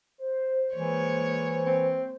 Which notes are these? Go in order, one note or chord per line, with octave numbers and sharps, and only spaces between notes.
C5
E3 G#3 A#3 C#5
C4